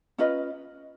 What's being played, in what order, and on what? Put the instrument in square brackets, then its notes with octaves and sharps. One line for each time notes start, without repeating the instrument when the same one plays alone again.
[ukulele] C#4 F4 B4 D#5